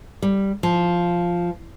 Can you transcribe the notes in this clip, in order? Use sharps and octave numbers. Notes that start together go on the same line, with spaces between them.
G3
F3